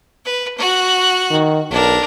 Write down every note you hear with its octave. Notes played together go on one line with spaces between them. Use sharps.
B4
F#4 F#6
D#3
B1 D4 A#4